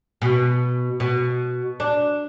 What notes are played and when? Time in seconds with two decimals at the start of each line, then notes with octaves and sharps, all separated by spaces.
0.22 B2
1.00 B2
1.80 D4